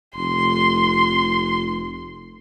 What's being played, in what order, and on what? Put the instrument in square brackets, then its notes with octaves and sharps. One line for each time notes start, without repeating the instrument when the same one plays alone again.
[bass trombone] F1 [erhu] C6